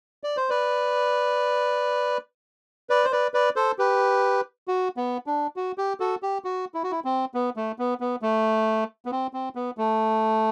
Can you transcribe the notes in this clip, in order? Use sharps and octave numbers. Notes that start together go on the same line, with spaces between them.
D5
C5
B4 D5
B4 D5
C5
B4 D5
B4 D5
A4 C5
G4 B4
F#4
B3
D4
F#4
G4
F#4 A4
G4
F#4
E4
F#4
E4
C4
B3
A3
B3
B3
A3
B3
C4
C4
B3
A3